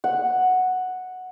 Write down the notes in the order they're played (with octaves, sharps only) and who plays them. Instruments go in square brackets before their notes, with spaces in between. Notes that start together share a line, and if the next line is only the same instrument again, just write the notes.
[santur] F#5